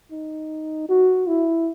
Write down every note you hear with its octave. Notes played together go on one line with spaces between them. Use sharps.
D#4
F#4
E4